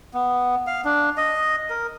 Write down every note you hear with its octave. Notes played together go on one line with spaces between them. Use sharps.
B3
F5
D4
D#5
A#4